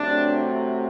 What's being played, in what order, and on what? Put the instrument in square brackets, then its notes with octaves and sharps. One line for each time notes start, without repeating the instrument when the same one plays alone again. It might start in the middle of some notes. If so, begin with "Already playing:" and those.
Already playing: [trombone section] C3 F#3 A3 D4